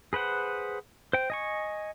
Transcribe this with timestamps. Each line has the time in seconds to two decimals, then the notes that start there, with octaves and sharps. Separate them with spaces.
0.13 G#4 B4 C5 F#5
1.13 C5 G5
1.30 D#5 G#5 C#6